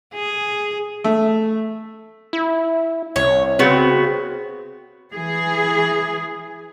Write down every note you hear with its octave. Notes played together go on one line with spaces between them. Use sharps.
G#4
A3
E4
C2 C#5
C#3 B3 C4 F#4
E3 G#4